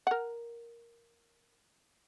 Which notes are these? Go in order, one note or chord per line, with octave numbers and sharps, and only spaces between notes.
A#4 F#5